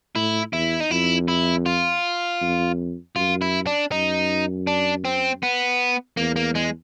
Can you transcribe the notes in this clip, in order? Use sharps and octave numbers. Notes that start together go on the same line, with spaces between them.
A2 E4
E2 E4
D#4
F2 E4
E4
F4
F2
F#2 F4
E4
D4
F#2 D#4
D4
C4
B3
E2 A#3
A#3
G#3